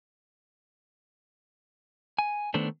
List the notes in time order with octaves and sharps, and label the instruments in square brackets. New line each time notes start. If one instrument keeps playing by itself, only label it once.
[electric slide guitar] G#5
D#3 A3 B3 D4 A4 C5